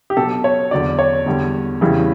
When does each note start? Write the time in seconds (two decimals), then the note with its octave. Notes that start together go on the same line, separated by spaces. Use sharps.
0.10 G4
0.17 B2 F#3 A4
0.44 C#5
0.71 E2 D3 F#3 D5
0.99 C#5
1.26 E2 D3 G3
1.81 E2 C#3 E3 G3